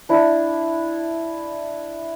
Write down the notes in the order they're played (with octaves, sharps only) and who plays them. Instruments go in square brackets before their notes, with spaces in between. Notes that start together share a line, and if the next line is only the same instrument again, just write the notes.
[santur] D4 E4